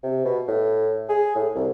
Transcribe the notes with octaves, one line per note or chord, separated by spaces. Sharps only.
C3
B2
A2
G#4
A2
C2